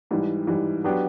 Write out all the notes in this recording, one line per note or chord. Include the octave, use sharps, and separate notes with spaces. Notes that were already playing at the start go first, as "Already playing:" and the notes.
G#2 E3 G3
G#2 E3 G3
F#3 B3 D4 G4